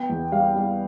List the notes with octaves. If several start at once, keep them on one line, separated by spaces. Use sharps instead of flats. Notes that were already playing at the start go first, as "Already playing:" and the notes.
Already playing: B3 G5
E2
G3 F5
G3